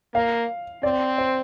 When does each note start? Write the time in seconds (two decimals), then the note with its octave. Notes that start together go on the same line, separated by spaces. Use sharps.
0.14 A#3 F5
0.83 C4 D5
1.18 C5